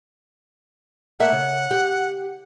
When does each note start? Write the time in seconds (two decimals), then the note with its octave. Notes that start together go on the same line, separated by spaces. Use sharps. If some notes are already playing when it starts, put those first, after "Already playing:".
1.20 A3 A#3 E5 F#5
1.32 C#3
1.71 G4